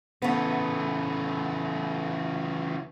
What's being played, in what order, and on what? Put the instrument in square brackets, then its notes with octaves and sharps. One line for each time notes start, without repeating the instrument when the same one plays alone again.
[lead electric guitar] C#3 E3 [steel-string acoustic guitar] A3 B3